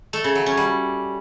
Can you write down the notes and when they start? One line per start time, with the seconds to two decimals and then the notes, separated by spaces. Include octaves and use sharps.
0.13 A3
0.24 C#3
0.35 F#3
0.46 C#4
0.57 G3